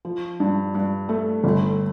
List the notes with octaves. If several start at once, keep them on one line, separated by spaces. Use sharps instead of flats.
F3
G2
G2
A3
G1